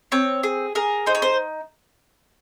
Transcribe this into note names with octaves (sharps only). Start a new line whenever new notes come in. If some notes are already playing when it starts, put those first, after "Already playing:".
C4 C#5
G#4
G#4 A#4
D#4 C5
C#5
C5